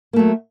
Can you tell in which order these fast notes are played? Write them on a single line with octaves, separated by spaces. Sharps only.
A#3 A3 F#3